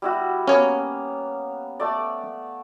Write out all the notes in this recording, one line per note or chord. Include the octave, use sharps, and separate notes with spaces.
G3 E4 F#4
A#3 B3 C#4 C#5 F5
A3 D5